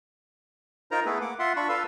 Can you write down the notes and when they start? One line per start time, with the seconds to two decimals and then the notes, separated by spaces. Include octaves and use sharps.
0.91 D#4 F4 A#4 C5 A#5
1.06 A3 B3 E4 G#4 A4 B4
1.21 A#3 F#5 D6
1.39 F4 E5 F#5 C6
1.56 D4 F4 B5 C#6
1.69 F4 A4 B4 F5 C6 E6